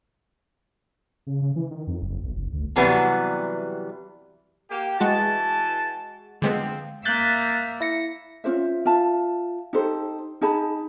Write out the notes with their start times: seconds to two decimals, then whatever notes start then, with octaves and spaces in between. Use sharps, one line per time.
1.27 C#3
1.42 C#3
1.56 E3
1.71 D#3
1.87 F2
2.02 F#1
2.24 B1
2.37 F#1
2.53 D2
2.76 C3 E3 F#3 G3 B3 B4
4.70 A#3 G4
5.00 E3 G#3 F#4 A5 A6
6.42 D3 F3 G#3 B3 C4
7.05 A#3 E5 F#6 G6 A6
7.81 E4 A#6 C#7
8.44 C#4 F4 C5 E5
8.86 F4 E5 A5
9.73 D#4 G4 A4 C5
10.42 D#4 G#4 A5 B5